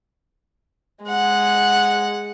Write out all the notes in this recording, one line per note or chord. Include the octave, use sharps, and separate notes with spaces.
G#3 F#5